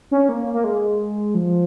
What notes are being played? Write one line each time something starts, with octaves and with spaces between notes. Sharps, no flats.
C#4
A#3
A#3
G#3
F3